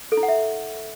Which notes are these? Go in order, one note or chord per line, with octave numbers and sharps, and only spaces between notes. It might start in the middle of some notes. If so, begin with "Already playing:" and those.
A4
E4
F#5
E5